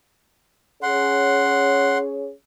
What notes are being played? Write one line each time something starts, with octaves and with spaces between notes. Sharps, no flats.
C#4 G#4 C#5 F#5 C6